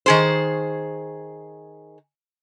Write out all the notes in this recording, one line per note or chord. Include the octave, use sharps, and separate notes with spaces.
D#3 G#4 C5